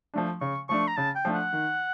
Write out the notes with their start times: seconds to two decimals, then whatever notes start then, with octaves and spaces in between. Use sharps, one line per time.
0.14 F3 A3 D4
0.41 C#3 C#6
0.69 F3 A3 D4 C#6
0.88 A#5
0.97 C#3 A5
1.16 G5
1.25 F3 A3 D4
1.34 F#5
1.53 D#3